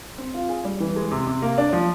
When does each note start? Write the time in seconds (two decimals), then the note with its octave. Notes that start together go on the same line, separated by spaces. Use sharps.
0.18 C4
0.34 F4
0.49 G#4
0.65 G3
0.80 E3
0.96 G#3
1.12 C3
1.27 C3
1.42 A#3
1.58 D4
1.73 F3